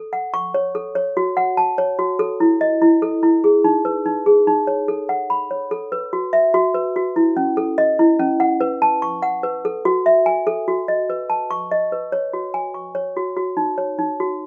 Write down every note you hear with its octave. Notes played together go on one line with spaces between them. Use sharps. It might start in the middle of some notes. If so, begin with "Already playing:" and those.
Already playing: A4
F#5
C#6
C#5
A4
C#5
F#4
F#5
A5
C#5
F#4
A4
E4
D#5
E4
A4
E4
G#4
D#4
B4
D#4
G#4
D#4
C#5
A4
F#5
B5
C#5
A4
B4
F#4
E5
F#4
B4
F#4
E4
C#4
A4
D#5
E4
C#4
F#5
B4
A5
C#6
F#5
B4
A4
F#4
E5
G#5
A4
F#4
D#5
B4
A5
C#6
D#5
B4
C#5
F#4
G#5
C#6
C#5
F#4
F#4
D#4
C#5
D#4
F#4